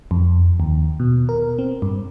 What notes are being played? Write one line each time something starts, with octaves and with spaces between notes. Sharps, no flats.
F2
D#2
B2
A#4
C4
G2